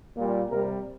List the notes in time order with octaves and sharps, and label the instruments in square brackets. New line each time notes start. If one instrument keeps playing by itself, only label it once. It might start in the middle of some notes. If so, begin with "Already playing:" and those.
[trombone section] A#2 G3
C3 G3 A#4